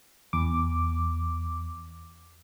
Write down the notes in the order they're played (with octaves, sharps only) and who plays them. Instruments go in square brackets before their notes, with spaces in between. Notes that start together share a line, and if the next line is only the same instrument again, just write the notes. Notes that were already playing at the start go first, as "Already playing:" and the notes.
[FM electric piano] E2 D6